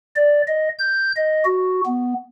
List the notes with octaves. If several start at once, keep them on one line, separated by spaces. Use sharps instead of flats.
D5
D#5
G6
D#5
F#4
B3